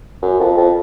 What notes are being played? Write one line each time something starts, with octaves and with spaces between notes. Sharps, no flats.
F#2
F2
F2